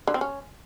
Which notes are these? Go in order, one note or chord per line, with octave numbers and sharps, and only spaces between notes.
D3
C4
C#4